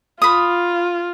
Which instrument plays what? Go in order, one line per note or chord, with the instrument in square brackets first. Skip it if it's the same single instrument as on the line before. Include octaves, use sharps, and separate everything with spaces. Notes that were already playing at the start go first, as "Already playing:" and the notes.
[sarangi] F4 [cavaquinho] B5 D#6